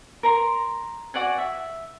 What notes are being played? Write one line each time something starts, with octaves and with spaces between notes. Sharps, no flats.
A#4 A#5 C6
F#4 D5 F#5 G#5
E5